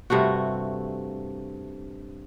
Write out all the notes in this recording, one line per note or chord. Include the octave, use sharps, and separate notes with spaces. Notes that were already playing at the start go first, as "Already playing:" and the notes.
G2 C3 A3 F#4